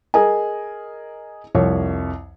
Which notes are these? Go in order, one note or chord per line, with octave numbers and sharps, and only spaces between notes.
G#4 A#4 D#5 G#5
C2 F2 C#5